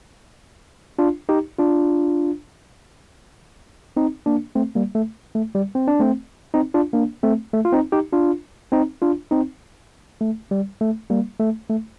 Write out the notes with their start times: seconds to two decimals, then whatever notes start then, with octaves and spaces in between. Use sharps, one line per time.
0.99 D4 F4
1.29 D#4 G4
1.58 D4 F4
3.97 C4 D#4
4.26 A#3 D4
4.55 A3 C4
4.75 G3 A#3
4.95 A3
5.35 A3
5.55 G3
5.75 C4
5.88 D4
6.00 A3 C4
6.54 C4 D#4
6.74 D4 F4
6.93 A#3 D4
7.23 A3 C4
7.54 A3
7.65 F4
7.73 C4 D#4
7.92 D#4 G4
8.13 D4 F4
8.72 C4 D#4
9.02 D4 F4
9.31 C4 D#4
10.21 A3
10.51 G3
10.81 A3
11.10 G3 A#3
11.40 A3
11.69 A3